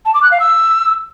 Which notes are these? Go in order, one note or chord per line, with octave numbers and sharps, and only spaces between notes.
A5
D6
F#6
F5
E6